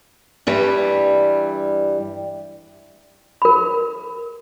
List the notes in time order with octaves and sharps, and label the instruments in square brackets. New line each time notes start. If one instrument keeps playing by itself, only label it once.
[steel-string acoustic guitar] G2 E3 G3
[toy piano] A#4 B5